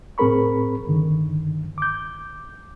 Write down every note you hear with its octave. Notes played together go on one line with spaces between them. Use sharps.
A2 C4 G#4 A#4 B5 C#6
G2 D3 D#3
D6 G6